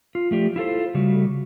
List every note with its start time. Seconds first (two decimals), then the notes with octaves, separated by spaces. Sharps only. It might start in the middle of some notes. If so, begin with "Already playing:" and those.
0.15 F4
0.31 F3 A3 G4 D5
0.56 E4 F4 A4 C5
0.94 C#3 G3 A3 F#4